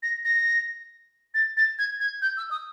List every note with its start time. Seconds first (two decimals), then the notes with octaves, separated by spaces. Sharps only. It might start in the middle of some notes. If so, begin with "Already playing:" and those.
0.03 A#6
0.25 A#6
1.34 A6
1.57 A6
1.79 G#6
2.00 G#6
2.22 G6
2.37 E6
2.51 D#6